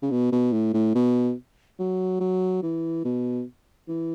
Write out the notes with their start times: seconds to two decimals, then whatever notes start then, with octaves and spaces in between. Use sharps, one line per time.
0.02 C#3
0.11 B2
0.32 B2
0.53 A2
0.74 A2
0.95 B2
1.79 F#3
2.20 F#3
2.62 E3
3.05 B2
3.88 E3